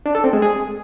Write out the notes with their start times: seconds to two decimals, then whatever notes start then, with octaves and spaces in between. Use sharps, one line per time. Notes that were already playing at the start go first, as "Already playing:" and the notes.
0.06 D4
0.15 A4
0.24 C4
0.33 G#3
0.42 G#4